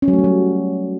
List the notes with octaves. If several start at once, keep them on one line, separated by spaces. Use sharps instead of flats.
C#4
F#3
A3
G3
F#3